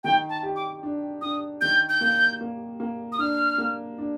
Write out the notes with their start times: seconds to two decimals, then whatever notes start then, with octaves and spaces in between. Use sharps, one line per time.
0.04 D#3 G5
0.29 A5
0.43 G4
0.56 D6
0.83 D4
1.21 D4 D#6
1.61 D#3 G6
1.89 G6
2.01 A#3
2.41 A#3
2.80 A#3
3.12 D#6
3.19 D4 F6
3.58 A#3
3.98 D4